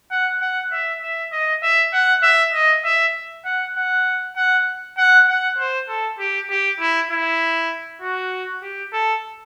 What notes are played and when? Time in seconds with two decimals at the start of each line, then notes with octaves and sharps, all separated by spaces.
0.11 F#5
0.41 F#5
0.72 E5
1.01 E5
1.32 D#5
1.63 E5
1.93 F#5
2.23 E5
2.54 D#5
2.84 E5
3.45 F#5
3.76 F#5
4.37 F#5
4.98 F#5
5.28 F#5
5.58 C5
5.88 A4
6.19 G4
6.50 G4
6.80 E4
7.10 E4
8.02 F#4
8.62 G4
8.93 A4